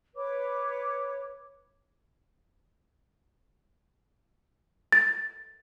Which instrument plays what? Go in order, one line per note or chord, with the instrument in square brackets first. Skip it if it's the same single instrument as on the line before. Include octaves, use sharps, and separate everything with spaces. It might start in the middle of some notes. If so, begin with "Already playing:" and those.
[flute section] B4 C#5 D6
[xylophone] A6